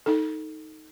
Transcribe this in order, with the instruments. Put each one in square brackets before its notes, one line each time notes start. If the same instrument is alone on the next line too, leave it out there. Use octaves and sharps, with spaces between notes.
[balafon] D#4 A4